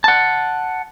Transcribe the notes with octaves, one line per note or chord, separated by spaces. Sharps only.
F#5 A5